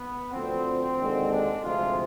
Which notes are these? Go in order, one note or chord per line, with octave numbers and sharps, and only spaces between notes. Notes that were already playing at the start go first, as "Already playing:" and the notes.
Already playing: B3
D2 D3 F3 C4
D#2 D3 G#3
D4
D2 C3 F3 G#3 F4